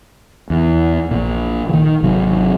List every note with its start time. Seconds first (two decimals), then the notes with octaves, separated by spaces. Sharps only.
0.50 E2
1.11 A#1 A#2
1.69 D#3 E3
2.02 G#1 C3 F#3